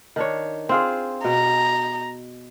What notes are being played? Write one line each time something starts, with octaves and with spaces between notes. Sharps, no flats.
D#3 D4 C#5
C4 F4 G#4
B2 A#5